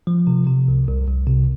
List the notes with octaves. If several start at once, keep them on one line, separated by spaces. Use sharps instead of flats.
F3
C3
C3
C2
C2
C2
C3